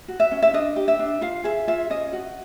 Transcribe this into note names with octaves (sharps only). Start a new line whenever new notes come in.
F#4
E5
C#4
E5
D4 D#5
G4
E5
D4
F4 F5
G#4 E5
F4 E5
C#4 D#5
F#4